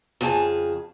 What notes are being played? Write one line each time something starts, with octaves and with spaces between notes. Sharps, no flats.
F2 C#3 G#4 G#5 A5